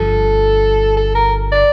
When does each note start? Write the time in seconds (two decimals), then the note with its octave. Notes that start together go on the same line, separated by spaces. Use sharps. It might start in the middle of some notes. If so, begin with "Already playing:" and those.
Already playing: G1 G2 F3 A4
0.97 A4
1.15 A#4
1.52 D5